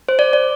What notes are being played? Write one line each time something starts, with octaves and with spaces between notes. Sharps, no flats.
C5
D5
D5